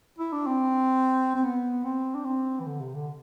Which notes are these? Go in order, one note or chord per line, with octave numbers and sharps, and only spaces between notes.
E4
D4
C4
C4
B3
C4
D4
C4
E3
D3
C3
D3